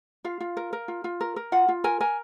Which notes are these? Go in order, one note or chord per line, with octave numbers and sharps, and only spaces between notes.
F4 F5
F4
A#4
A#4
F4
F4
A#4
A#4
F4 F#5
F4
A#4 G#5
A#4 G#5